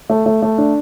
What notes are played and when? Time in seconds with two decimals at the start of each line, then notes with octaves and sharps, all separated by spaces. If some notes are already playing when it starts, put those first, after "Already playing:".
0.10 A3
0.26 A3
0.42 A3
0.58 D4